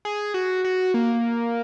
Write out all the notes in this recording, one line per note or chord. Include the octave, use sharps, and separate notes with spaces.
G#4
F#4
F#4
A#3